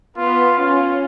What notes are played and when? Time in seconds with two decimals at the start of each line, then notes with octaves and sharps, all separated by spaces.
0.17 B3 F4
0.58 C#4 F4